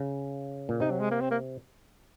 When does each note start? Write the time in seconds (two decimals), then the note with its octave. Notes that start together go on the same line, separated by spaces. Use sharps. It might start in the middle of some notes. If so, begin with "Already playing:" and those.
Already playing: C#3
0.69 A#2
0.80 C3 D#4
0.91 F#3
1.00 G#3
1.11 A#3
1.21 C4
1.31 A#3